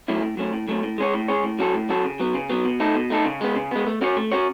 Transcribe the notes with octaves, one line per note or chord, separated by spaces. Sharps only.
F#3 A3 C#4 E4
A2
F#3 A3 C#4
A2
F#3 A3 C#4
A2
G#3 C#4 G#4 C#5
A2
G#3 C#4 G#4 C#5
A2
F#3 C#4 F#4 A4
A2
F#3 C#4 F#4 A4
C#3
F#3 B3
C#3
F#3 B3
B2
A3 D#4 A4
B2
A3 D#4 A4
C#3
G#3 B3
C#3
G#3 B3
A3
C#4 F#4 C#5
A3
C#4 F#4 C#5